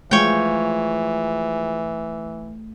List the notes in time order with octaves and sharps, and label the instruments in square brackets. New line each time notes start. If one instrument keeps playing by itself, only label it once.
[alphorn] E3 [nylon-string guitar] F3 G#3 F5 [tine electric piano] A3 [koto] C#5 G5